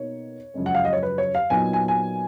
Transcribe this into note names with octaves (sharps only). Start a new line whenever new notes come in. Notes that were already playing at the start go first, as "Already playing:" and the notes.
Already playing: B2 A#3 D#4 C#5
F#2 C#3 F3 G#3 C#4
F#5
F5
D#5
C#5
B4
C#5
F5
A#2 F#3 B3 D#4 G#5
G#5
G#5